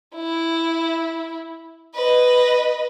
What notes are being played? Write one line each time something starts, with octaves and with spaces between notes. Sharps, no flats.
E4
B4 D#5